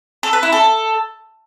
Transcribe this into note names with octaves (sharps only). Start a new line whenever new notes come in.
A4
B4
E4
A4